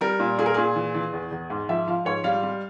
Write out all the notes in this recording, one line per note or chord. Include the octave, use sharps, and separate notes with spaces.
G3 A#4
A#2
A#2 G#4
A#4
A#2 G#4
E3
E3
E2
E2
G#2
F3 E5
F3 F5
G#2 C#5
G3 F5
G3